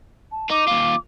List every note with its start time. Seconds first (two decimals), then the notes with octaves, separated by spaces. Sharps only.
0.31 A5
0.51 D#4 D6
0.68 D#2 F4